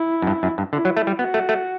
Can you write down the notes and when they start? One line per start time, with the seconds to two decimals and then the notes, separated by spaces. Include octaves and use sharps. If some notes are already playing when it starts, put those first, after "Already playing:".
Already playing: E4
0.22 F#2
0.27 G2
0.43 F#2
0.58 G2
0.73 D3 E4
0.85 F#3
0.97 A3
1.07 G3
1.18 B3 F#4
1.34 A3
1.49 A3